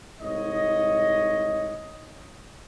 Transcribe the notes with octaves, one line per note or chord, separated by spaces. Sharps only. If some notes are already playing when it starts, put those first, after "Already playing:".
C2 G#2 C#5 D#5